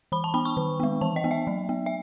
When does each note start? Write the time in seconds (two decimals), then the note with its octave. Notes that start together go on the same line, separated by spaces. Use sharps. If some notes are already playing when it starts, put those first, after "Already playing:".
0.12 E3 B5
0.24 A5
0.34 B3 B5
0.45 C#6
0.57 D#3
0.80 G#3 B3
1.01 E3 A5
1.16 D#5
1.24 B3
1.31 E5
1.47 F#3
1.69 B3
1.86 E5